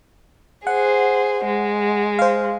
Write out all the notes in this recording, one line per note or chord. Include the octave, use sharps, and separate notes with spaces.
G#4 C5 F#5
G#3
C5 F5